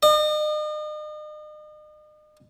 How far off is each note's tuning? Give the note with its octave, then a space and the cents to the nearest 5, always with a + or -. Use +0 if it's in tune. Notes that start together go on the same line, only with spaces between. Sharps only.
D#5 -40